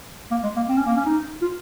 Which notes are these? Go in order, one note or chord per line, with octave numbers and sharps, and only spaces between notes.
A#3
G#3
A#3
C4
C#4
A#3
C#4
D#4
F4